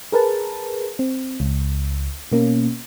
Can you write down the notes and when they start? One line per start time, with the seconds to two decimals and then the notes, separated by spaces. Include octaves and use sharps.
0.12 G#4 A#4 B4 A5
0.99 C4
1.40 C#2
2.32 B2 A#3 C#4